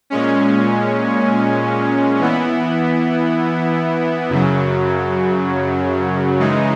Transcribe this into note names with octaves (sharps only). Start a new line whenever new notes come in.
A#2 G#3 C#4
E3 B3 E4
F#2 C#3 F#3
C#3 E3 G#3 D#4